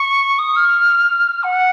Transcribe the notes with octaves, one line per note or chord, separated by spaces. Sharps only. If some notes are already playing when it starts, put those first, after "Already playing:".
Already playing: C#6
D#6
F6
F#5